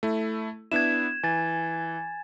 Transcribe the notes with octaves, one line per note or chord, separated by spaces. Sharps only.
A3 E4
B3 D4 E4 G#6 E7
E3 G#5 A6